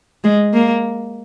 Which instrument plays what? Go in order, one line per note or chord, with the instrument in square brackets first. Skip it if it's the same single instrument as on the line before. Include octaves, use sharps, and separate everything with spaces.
[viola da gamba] G#3
A#3